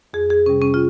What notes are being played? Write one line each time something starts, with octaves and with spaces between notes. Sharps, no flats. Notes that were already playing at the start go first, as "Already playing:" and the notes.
F2 G#4
G#4
C3 G3 C#4
C#4
F4